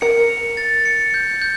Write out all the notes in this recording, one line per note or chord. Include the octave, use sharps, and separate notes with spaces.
A#4 C#7
F7
A6
C#7
G6
G6